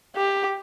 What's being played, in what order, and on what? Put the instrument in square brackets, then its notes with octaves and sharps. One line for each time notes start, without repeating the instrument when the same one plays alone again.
[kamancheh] G4